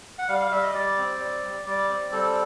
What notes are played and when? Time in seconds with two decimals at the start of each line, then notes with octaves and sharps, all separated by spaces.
0.19 F#5
0.28 G3 F5
0.40 F5
0.51 G3 E5
0.63 D#5
0.74 G3 D5
0.98 C4
1.20 G3
1.44 G3
1.66 G3 D5
1.89 C4
2.12 G3 A4